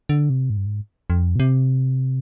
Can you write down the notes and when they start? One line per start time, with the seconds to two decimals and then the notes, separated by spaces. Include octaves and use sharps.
0.09 D3
0.30 C3
0.50 G#2
0.57 G2
0.66 G#2
1.10 F2
1.36 B2
1.40 C3